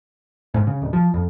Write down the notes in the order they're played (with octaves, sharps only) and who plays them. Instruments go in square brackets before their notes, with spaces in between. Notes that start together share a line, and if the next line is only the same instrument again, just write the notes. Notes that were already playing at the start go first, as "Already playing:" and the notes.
[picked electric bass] G#2
C#3
D1
F3
F2